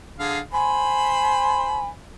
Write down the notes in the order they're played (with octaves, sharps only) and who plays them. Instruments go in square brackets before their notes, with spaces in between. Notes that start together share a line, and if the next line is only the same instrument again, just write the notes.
[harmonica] D3 G#4 F5
[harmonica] C5 B5 [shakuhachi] G#5